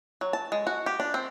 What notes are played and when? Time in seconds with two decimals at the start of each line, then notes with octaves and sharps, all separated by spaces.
0.21 F#3
0.33 A5
0.52 G#3
0.67 F#4
0.86 G4
1.00 D4
1.14 C4